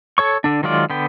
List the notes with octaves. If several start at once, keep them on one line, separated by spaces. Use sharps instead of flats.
A4 C#5 C#6
D3 D4
D#3 F#3 G#3 F4 D5
D3 B3 G5